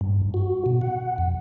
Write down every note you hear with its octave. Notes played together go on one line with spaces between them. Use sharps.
G2
F#4
B2
F#5
F2